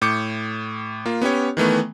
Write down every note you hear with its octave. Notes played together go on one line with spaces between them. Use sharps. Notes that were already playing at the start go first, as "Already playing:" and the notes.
A2 D6 G6 C#7
A#3 F4
B3 C#4 G4 C#5
D#3 E3 A3 B3